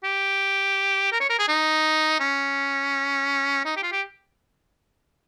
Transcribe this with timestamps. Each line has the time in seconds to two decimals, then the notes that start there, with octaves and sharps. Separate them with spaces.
0.04 G4
1.12 A#4
1.20 C#5
1.30 A#4
1.39 G#4
1.48 D#4
2.20 C#4
3.65 D#4
3.77 G4
3.83 F4
3.92 G4